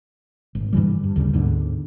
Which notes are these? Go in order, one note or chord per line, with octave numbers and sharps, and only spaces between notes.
G#1
G2 D3 E3 G3
G2
G1 D2 C#3 G3
D2 G#2 B2 D3